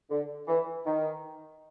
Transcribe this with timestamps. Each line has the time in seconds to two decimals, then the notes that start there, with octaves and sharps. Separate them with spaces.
0.10 D3
0.48 E3
0.86 D#3